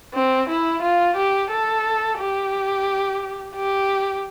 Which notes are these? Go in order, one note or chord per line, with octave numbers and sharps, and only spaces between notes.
C4
E4
F4
G4
A4
G4
G4